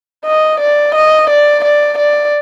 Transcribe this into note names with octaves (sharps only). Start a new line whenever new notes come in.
D#5
D5
D#5
D5
D5
D5